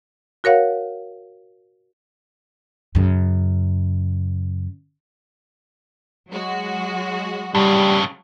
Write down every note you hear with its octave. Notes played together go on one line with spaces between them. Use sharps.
F#4 A#4 C#5 F5 F#5
F#2 C#3
F#3 G#3 F#4
G2 C#3 G3